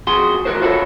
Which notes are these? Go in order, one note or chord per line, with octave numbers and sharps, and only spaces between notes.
F2 F#4 G#4 C6
E3 F#3 F#4 A#4 C5
F4 F#4 A4 B4 C#5 E5